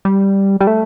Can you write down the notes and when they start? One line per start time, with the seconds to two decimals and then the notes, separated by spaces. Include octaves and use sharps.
0.05 G3
0.60 G3
0.67 A3